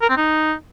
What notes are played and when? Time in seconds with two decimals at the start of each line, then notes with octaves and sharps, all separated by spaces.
0.01 A#4
0.09 C4
0.17 D#4